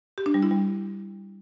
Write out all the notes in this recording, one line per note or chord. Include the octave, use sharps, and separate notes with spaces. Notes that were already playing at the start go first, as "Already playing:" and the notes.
G4
D4
G3
E4
G3